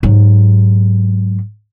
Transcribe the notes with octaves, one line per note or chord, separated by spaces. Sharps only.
G#2 F#3